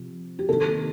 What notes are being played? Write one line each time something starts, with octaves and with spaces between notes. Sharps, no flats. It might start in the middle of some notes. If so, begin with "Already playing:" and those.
Already playing: C3 F3
G4
C3 D#3 A#3 D#4 A4